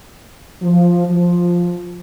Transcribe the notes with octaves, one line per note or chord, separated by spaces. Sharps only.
F3
F3